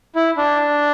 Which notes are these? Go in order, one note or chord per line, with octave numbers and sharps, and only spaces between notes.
E4
D4